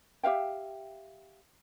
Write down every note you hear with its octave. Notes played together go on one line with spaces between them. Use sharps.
G4 E5 F5 G5